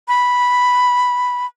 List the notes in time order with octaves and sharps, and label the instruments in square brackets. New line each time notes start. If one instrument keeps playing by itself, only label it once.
[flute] B5